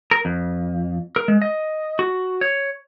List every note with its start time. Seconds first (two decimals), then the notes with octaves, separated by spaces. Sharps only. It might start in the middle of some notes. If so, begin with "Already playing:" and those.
0.11 A#4
0.25 F2
1.16 A#4
1.28 G#3
1.42 D#5
1.99 F#4
2.41 C#5